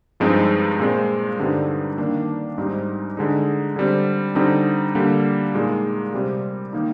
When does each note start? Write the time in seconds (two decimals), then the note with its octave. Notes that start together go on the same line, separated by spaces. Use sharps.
0.20 G2 F3 G#3 C4 D#4
0.79 A#2 G#3 C4
1.39 G2 D3 G3 C4 D#4
1.98 D#3 A#3 D4
2.58 G#2 G3 C4 D#4
3.17 D3 G#3 D#4
3.76 D3 G3 C4
4.35 D3 G3 C4 D#4
4.95 D3 G3 A#3
5.55 A#2 G#3 D#4
6.14 C3 G3 C4
6.73 D#3 A#3 D#4